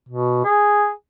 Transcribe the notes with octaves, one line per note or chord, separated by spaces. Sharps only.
B2
G#4